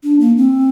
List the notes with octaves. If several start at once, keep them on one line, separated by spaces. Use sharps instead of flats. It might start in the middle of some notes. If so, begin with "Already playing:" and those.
D4
A#3
C4